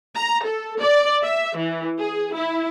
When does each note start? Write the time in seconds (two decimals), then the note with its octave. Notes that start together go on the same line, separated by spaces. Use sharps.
0.16 A#5
0.44 A4
0.80 D5
1.23 E5
1.57 E3
1.97 G#4
2.33 E4